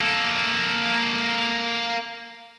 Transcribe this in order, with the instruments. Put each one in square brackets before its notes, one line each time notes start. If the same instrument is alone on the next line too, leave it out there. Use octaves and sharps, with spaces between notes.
[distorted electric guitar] A#3 A4